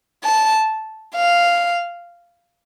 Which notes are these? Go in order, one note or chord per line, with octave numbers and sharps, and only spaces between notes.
A5
F5